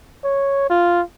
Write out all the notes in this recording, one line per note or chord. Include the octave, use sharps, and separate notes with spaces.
C#5
F4